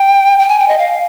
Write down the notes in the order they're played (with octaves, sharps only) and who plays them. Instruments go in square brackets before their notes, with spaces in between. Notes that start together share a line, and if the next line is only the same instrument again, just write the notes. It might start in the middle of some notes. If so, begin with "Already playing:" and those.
Already playing: [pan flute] G5
G5
G#5
G5
D#5
F5